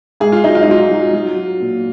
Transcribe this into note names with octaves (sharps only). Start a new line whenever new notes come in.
G#2 G#4
F4
F#3 D#4
F4
D#4
F#3 F4
F#3
F#3
F#3
A#2